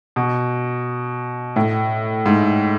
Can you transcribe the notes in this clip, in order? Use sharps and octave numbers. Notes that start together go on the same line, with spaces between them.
B2
A2
G#2